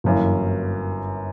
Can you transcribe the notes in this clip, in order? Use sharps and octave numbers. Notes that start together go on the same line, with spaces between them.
G1 F#2 E3 A#3